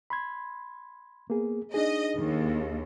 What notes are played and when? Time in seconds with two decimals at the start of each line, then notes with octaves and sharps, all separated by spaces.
0.10 B5 C6 G#6
1.30 A#3 B3 G#4
1.74 D4 D#4 G#4 D#5
2.18 D#2